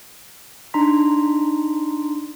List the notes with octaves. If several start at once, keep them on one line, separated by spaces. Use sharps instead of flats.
D4 D#4 A#5 C6 B6